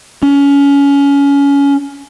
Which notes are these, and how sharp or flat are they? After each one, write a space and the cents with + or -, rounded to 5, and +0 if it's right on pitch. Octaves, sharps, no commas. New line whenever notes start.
C#4 +25